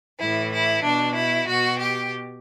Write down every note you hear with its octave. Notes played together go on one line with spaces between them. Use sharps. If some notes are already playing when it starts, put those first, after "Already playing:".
A2 E3 E4
E4
B2 D4
E4
B2 F#4
G4